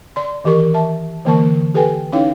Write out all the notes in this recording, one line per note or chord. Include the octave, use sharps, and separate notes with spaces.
D5 C6
D#3 E3 G4 A#4 C#6
E5 A5
D3 E3 A#3 A#4 A5 C#6
G4 A4 B4 G5 G#5
C#4 D#4 E4 C#5 F5 G5